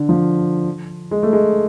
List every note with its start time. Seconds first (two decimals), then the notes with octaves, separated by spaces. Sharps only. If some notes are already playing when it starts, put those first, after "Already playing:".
Already playing: D3
0.09 F3
1.11 G#3
1.23 A3
1.33 G#3